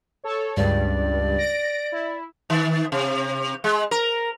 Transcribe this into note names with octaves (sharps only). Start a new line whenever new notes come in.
A4 C#5
C#2 G2 D5
A#6 D7
E4
D#3
C3
G#3
A#4